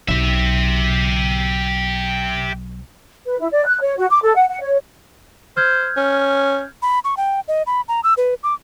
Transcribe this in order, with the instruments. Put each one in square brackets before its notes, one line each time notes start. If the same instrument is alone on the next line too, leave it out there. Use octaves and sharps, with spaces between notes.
[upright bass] B1 F#3 [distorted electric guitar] G4 E5
[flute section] B4
E4
D5
F#6
C#5
F#4
D6
A4
F#5
F#5
C#5
[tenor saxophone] C5 [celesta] F6 G6 G#6
[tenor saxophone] C#4
[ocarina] B5
C#6
G5
D#5
B5
A#5
E6
B4
D6